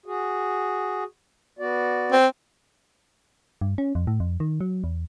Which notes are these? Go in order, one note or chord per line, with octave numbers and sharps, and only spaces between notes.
F#4 G#4
B3 F#4 D5
C4
G2
C#4
F2
A2
F2
D#3
F#3
E2